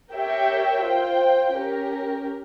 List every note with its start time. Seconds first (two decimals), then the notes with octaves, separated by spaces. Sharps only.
0.13 G4 A#4 C#5 E5 G5
0.83 F4 C5 G5
1.54 C#4 G4 A#4